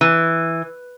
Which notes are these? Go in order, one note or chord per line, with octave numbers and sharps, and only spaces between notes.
E3